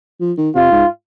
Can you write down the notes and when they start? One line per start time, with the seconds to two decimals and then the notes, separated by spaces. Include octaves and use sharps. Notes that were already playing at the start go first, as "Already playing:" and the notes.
0.20 F3
0.38 D#3
0.55 C3 F4
0.72 G#2